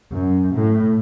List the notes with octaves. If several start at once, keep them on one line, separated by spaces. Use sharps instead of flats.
F#2
A2